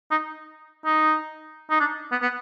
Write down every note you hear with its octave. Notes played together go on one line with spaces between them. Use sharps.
D#4
D#4
D#4
D4
B3
B3